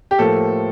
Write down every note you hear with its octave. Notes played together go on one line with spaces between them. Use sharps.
G4
A2 F3 A#3 A4